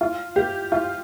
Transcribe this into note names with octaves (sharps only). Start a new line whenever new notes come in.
F4
G4
F4